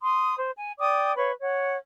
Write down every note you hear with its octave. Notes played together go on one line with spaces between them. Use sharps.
C6 D#6
C5
G#5
D5 G5 D6 D#6
B4 C#5 F5 C#6
C#5 F#5